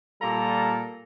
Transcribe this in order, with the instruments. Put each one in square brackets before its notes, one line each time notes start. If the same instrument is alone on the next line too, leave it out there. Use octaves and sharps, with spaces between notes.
[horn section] A#2 G3 F4 A4 A#5